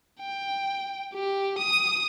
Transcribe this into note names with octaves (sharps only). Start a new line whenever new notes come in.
G5
G4
D#6